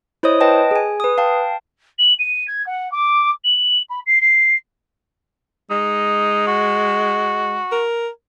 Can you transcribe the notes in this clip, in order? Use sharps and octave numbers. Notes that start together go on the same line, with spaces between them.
E4 C5 C#5 D#5 D#6
B4 D#5 G5 A5
G#4 G#5
B4 D#6
F5 G5 A5
F#7
D#7
G#6
F#5
D6
F#7
B5
C7
C7
G#3 D#4
F#4
A#4